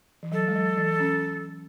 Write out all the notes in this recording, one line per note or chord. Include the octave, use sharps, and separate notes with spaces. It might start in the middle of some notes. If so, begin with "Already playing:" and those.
E3
F#3 A4
G#3
F#3
E3
C#4